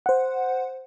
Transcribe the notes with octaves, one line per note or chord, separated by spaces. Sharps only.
C5 F#5